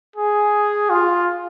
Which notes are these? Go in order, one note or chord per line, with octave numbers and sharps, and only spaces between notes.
G#4
F4